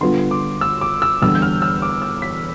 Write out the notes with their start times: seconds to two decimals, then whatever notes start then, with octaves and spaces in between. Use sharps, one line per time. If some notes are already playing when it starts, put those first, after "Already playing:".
0.01 D3 G3 B3 F4 C6
0.31 D6
0.61 E6
0.81 D6
1.02 E6
1.22 E2 D3 G3 E6
1.35 G6
1.42 F6
1.62 E6
1.82 D6
2.02 E6
2.22 B6